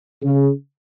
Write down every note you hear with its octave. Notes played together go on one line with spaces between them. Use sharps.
C#3